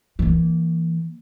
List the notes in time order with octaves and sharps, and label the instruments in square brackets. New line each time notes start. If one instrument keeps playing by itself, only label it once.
[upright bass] E3 A#3